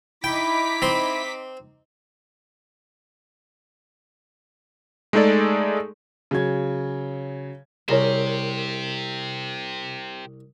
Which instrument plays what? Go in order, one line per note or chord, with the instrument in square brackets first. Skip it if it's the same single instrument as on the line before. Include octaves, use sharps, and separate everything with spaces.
[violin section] D#4 D6 B6 [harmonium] E4 [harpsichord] G5
[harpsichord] C4 C6
[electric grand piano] G#3 A3 D#4 G#4 A4 D5
[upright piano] C#3 F#3 G#6
[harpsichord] C2 [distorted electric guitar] G4 C5 [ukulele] G#4 A#4 C#5